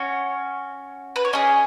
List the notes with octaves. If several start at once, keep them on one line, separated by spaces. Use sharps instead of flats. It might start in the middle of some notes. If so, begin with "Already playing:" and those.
Already playing: C#4 F#4 C#5
B4
C#5
C#4 G#4 D#5